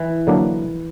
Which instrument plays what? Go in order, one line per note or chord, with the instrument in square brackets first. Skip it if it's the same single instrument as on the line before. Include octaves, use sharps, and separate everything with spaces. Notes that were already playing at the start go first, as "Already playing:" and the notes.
Already playing: [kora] E3
[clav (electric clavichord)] D3 F#3 A#3 D4